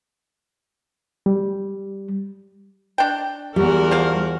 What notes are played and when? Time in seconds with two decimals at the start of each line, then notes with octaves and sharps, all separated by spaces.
1.26 G3
2.98 D4 G5
3.56 E2 G3 F#4 A#4
3.91 F3 F5